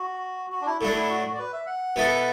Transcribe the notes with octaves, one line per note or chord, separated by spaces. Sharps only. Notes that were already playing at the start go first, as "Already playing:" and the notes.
Already playing: F#4
F#4
D4
E4
A2 F#3 D4 E4
E4
F#4
F#4
D5
B4
E5
F#5
B2 B3 E4 A4